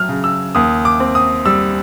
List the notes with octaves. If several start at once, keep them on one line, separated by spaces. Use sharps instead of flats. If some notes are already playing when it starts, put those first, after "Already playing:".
Already playing: F#3 A3 F6
C#3
E6
D#2 D#6
D6
C4
D#6
G3 E6